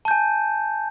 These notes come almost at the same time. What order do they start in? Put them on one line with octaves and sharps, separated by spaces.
A5 G6 G#5